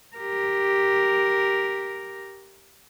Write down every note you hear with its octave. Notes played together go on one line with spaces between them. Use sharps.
G4 A#4